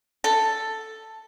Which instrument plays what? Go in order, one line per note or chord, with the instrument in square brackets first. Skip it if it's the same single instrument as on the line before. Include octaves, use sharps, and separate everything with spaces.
[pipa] A4